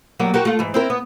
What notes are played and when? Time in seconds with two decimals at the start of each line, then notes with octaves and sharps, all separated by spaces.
0.20 F#3 G3 A#3
0.34 F#4 G4 A#4
0.45 A3 F4
0.59 G#2 E3
0.74 C4 E4 A#4
0.90 B3